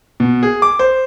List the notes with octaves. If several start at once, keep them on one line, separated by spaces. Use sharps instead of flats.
B2
G#4
D6
C5